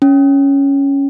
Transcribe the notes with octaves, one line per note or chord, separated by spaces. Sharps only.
C#4